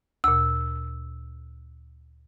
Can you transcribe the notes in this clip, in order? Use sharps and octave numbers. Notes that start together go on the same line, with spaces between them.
D2 A#2 E6